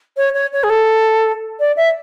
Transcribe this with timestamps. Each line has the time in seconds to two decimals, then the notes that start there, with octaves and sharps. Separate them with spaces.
0.17 C#5
0.34 C#5
0.53 C#5
0.64 G#4
0.70 A4
1.60 D5
1.77 E5